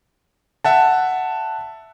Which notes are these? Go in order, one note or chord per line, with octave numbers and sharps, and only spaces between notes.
E5 F#5 A5